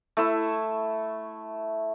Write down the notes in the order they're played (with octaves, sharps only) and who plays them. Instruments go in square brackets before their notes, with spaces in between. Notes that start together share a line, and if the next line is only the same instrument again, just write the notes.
[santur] A3 E4 E6